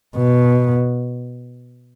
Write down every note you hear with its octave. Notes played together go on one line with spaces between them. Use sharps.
B2